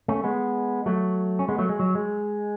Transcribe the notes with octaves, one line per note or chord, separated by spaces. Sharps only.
A3 C#4
G#3 B3
F#3 A3
C#4
G#3 B3
F#3 A3
G#3
F#3
G#3